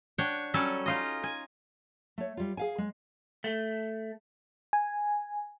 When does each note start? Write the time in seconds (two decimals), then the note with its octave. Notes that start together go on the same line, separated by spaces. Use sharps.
0.18 D4 C#5 F#5 G5
0.54 F#3 G3 C#4 A4 D5
0.86 D#4 F4 D#5
1.23 G#5
2.18 A3 C#5
2.37 G3 F4
2.57 G#4 F5 G#5
2.78 G#3
3.44 A3
4.73 G#5